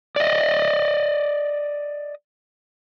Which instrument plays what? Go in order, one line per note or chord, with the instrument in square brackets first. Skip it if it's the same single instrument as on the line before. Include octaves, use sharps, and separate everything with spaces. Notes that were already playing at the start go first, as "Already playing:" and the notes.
[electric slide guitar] D5 D#5